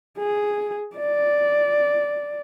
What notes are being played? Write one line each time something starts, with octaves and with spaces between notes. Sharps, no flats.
G#4
D5